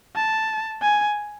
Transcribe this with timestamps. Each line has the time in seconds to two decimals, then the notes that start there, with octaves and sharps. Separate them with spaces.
0.16 A5
0.82 G#5